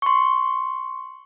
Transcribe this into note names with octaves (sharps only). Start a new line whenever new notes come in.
C6 C#6